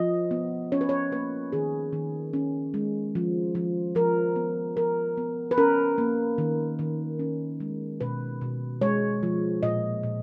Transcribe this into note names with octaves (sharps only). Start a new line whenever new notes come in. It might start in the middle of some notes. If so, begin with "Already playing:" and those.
Already playing: F3 D#5
B3
C#4 C#5
B4
C#5
A#3 B4
D#3 G#4
D#3
C#4
G#3
F3
F3
F3 A#4
B3
F3 A#4
B3
B4
C#4 A#4
A#3
D#3
D#3
C#4
G#3
B2 B4
B2
G#3 C#5
F3
A#2 D#5
A#2